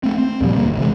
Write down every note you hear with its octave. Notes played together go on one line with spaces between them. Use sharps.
A3 C4
C4
D#2 A#2 F3 G3
D2 B2 G3 A#3
G#1
C3 E3 G#3